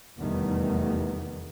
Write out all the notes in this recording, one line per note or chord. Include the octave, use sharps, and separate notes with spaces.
F1 E2 D#3 G3 A3 B3